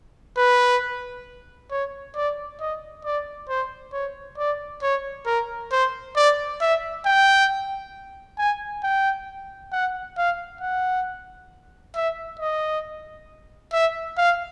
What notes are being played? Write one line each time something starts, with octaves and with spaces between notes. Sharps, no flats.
B4
C#5
D5
D#5
D5
C5
C#5
D5
C#5
A#4
C5
D5
E5
G5
G#5
G5
F#5
F5
F#5
E5
D#5
E5
F5